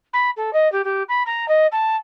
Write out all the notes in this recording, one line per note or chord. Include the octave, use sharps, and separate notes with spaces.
B5
A4
D#5
G4
G4
B5
A#5
D#5
A5